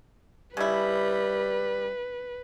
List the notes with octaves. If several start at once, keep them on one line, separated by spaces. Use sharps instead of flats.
C#3 G3 E4 B4